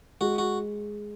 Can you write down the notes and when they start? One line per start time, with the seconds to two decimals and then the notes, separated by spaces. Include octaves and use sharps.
0.21 G#3 F#4
0.38 F#4